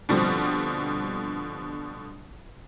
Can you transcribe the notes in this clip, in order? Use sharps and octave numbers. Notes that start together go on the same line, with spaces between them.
B2 D3 F3 G3 C4